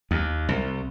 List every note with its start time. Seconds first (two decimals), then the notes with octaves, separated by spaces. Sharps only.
0.11 D#2
0.49 C2